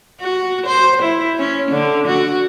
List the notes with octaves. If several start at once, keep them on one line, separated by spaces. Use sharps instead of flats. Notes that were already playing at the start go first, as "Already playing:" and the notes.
F#4
C5
E4
C#4
D3
F#4